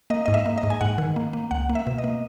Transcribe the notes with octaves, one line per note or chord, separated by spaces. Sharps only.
A#3 D#5
G#2 D#5
E5
A#3
D#5
G#2
G#5
G#2 F#5
D#3
A#3
A#3
C#2 F#5
A#3
E5
B2
D#5
A#3